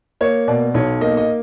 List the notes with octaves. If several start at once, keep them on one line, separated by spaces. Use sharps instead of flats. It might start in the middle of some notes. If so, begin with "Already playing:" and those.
A#3 C#5
B2 D5
B1 C#5
A#3 D#5
D#5